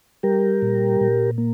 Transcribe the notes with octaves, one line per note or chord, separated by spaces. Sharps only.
G3 G4 A#4
A#2
A#2
A#3